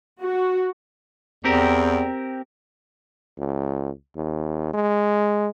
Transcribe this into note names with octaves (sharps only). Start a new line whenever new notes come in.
F#4
E2 C4 G4 A#4
C#2
D#2
G#3